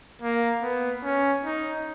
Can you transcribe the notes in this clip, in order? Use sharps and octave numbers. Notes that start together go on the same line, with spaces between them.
A#3
B3
C#4
D#4